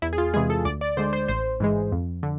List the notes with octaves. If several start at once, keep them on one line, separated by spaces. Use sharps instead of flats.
E2 E4
G#4
F4
C3 E3 G#3 G#4
A4
D2 D5
D5
D3 G#3 C5
C5
A1 C5
G#2 E3 G#3
F2
D3